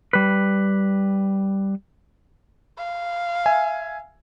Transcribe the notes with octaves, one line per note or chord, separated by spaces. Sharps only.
G3 B4
F5
E5 G#5